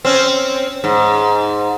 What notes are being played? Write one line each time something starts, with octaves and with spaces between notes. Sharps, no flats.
C4 C#4
G#2